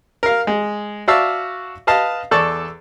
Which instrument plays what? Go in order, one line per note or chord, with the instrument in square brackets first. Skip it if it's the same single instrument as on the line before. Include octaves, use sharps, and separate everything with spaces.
[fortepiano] A#4 F5
G#3
F#4 D5 E5 F5 A5 E6
B4 D#5 F5 A5
E2 A4 D5 A5 C#6